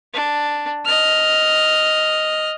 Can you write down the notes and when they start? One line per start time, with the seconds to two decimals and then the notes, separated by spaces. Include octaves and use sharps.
0.14 D4
0.85 D#5 F6